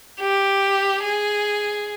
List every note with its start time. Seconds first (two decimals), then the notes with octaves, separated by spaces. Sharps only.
0.20 G4
1.03 G#4